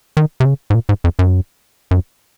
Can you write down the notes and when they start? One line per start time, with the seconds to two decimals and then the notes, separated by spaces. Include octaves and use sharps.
0.17 D#3
0.40 C3
0.45 C#3
0.70 G#2
0.75 A#2
0.89 G#2
1.04 F2
1.19 F#2
1.91 F#2